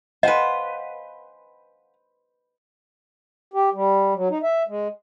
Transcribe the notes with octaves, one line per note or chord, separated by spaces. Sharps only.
B4 C5 D#5 F5 F#5 G#5
G4
G3
F#3
D#4
E5
G#3